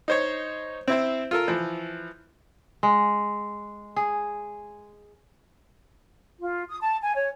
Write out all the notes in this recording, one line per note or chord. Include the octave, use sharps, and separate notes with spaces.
D#4 C5 C#5
C4 E4 C5
F4 A4 A#4
E3 F3
G#3
G#4
F4
D#6
A5
G#5
C#5